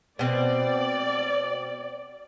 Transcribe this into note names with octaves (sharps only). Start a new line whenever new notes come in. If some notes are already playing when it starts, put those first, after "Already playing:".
B2 C4 D5